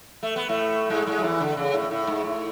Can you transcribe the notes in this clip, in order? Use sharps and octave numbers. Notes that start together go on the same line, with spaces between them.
A3
B3
A2 A3
G#2 G#3
G#2 G#3
F#3
E2 E3
D3
C#3
A2
A2
G#2
A2